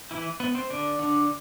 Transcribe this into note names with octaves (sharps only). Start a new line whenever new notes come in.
E3 E4
B3
C4
D3 D4
D3 D4